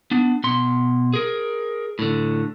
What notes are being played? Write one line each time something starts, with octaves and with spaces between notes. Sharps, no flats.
B3 D4
B2 C6
G#4 A#4
A2 D3